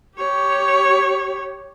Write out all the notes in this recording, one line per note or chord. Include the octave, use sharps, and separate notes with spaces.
G4 C#5